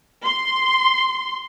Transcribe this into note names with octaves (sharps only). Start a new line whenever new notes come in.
C6